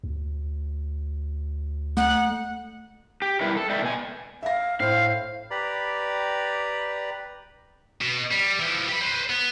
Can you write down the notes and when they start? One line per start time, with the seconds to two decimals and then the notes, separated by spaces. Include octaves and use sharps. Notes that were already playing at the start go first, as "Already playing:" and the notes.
0.04 D2
1.97 A3 F#5
3.22 G4
3.41 B2 G3 E4 A#4 B4 E5
3.57 A4
3.70 G#3 A3 D5 E5 G5
3.82 B2 G#5
4.43 E5 F5 A#6
4.80 A2 C5 F5
5.51 G4 B4 D5 A#5 B5
8.01 B2
8.31 G3
8.60 E3 F3
8.89 G4 B5
9.02 B4 C5
9.29 B3